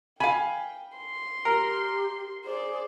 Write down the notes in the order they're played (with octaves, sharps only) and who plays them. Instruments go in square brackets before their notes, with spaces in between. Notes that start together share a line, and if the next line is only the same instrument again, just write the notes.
[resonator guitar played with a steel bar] F5 G#5 [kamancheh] G5 [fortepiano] B5
[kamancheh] C6
[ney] G4 [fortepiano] A#4
[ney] G#4 [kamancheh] C5 D5